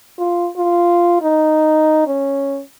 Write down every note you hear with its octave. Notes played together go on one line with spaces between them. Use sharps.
F4
F4
D#4
C#4